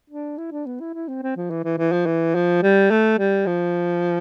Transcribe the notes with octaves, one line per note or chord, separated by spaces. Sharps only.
D4
E4
D4
B3
E4
E4
C4
C4
F3
E3
E3
E3
F3
E3
F3
G3
A3
G3
F3